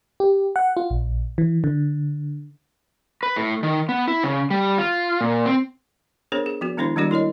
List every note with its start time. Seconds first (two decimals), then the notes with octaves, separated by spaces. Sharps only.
0.20 G4
0.56 F#5
0.77 F4
0.90 A#1
1.38 E3
1.64 D3
3.23 B4
3.36 A2
3.63 D#3
3.89 B3
4.07 E4
4.24 C#3
4.50 G3
4.78 F4
5.21 A#2
5.46 C4
6.32 B3 D4 G#4 A#4 C5 C#5
6.46 G#4
6.61 F3 B3 F#4
6.77 D#3 G#3 B3 D4 E4 C5
6.96 D#3 G3 A#3 D4 F#4 D5
7.11 E4 A#4 C#5 D#5